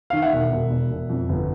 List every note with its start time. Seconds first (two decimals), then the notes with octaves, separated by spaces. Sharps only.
0.10 D#3 F5
0.22 E5 F#5
0.33 E1
0.52 E1
0.70 E1
0.90 E1
1.09 F2
1.29 G1